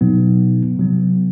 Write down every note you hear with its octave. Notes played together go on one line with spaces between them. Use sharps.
B2 F#3 B3 D#4
C3 F#3 B3